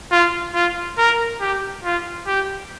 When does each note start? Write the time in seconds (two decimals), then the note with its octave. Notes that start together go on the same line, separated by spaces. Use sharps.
0.11 F4
0.55 F4
0.98 A#4
1.41 G4
1.84 F4
2.27 G4